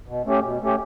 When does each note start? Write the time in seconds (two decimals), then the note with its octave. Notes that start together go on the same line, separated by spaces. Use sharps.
0.08 B2
0.26 A3 C#4 G4
0.44 B2
0.61 A3 C#4 G4